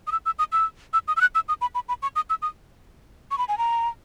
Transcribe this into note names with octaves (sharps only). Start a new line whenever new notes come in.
D#6
E6
E6
D#6
E6
E6
D#6
E6
F#6
E6
D#6
B5
B5
B5
C#6
D#6
E6
D#6
C#6
B5
G#5
A#5